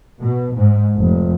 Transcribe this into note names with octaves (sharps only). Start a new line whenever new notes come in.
B2
G#2
F1